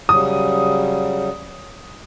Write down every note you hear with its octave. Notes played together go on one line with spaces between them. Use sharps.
C#3 F#3 G3 D#6